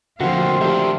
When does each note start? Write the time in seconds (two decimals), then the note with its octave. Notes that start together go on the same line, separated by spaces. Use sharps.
0.21 D3 F3 A3 A#3 C4 E4 F#4 F5
0.61 D#3 D4 G4 E5